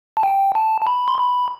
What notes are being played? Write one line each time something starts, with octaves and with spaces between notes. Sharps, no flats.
A5
G5
A5
A5
B5
C6
B5